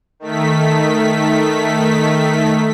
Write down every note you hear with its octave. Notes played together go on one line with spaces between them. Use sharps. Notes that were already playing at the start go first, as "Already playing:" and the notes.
D#3 A3 B6